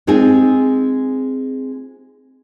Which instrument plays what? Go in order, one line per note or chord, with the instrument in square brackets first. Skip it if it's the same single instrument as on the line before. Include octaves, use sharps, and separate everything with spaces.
[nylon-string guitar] G#3 C4 D#4 F4 G#4